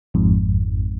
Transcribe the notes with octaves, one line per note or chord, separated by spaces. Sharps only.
G#1 F2 G#2